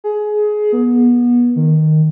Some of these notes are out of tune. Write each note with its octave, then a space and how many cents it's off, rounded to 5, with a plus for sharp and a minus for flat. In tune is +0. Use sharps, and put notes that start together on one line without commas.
G#4 +20
B3 -30
D#3 -5